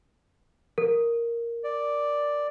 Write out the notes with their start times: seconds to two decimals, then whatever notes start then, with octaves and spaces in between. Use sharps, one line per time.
0.78 A#4
1.64 D5